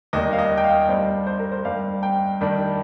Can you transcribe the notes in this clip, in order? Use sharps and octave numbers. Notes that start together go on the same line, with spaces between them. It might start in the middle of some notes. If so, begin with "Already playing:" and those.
D#2 D#3 G3 D#5
F5
D#5
G5
F5
G2 G3 C5
C5
A#4
C5
G2 G3 F5
G5
G2 D#3 G3